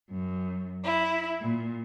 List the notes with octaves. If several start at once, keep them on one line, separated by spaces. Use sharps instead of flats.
F#2
E4
A#2